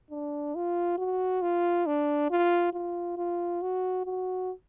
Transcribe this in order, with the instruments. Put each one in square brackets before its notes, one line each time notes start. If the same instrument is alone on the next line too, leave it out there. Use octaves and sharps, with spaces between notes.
[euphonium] D4
F4
F#4
F4
D4
F4
F4
F4
F#4
F#4